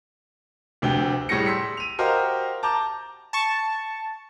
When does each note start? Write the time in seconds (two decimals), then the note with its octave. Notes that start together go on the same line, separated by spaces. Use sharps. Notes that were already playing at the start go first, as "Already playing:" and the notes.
0.82 F1 D2 C3 G4 G7
1.29 A2 G3 G#4 A#6 C#7
1.46 C6 E6 B6 C#7
1.77 D#7 F7
1.99 F#4 G4 A#4 C5 D#5 F5
2.63 A5 A#5 D6 G6
3.33 A5 C#6